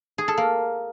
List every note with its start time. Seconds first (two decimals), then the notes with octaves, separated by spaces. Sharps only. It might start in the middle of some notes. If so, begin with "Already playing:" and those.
0.18 G#4
0.28 A4
0.38 A#3